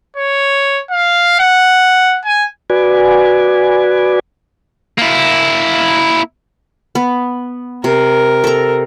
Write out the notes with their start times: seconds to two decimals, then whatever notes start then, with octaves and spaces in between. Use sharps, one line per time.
0.17 C#5
0.91 F5
1.39 F#5
2.26 G#5
2.70 F#4 B4 D5 G#5
4.98 A#3 E4
6.95 B3
7.84 C3 A#4
8.44 A4 A#5